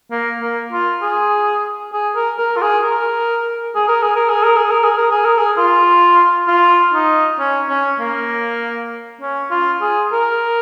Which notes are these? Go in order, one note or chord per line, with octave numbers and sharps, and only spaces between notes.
A#3
A#3
F4
G#4
G#4
A#4
A#4
F4
G#4
A#4
G#4
A#4
G#4
A#4
G#4
A#4
G#4
A#4
G#4
A#4
G#4
A#4
G#4
F4
F4
D#4
C#4
C#4
A#3
C#4
F4
G#4
A#4